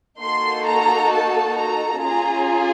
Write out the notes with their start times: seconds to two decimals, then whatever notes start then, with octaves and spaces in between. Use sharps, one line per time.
0.20 A#3 D#4 F#4 A4 C6
0.66 A#5
1.12 A5
1.57 A#5
2.02 C#4 F4 G#4 A#5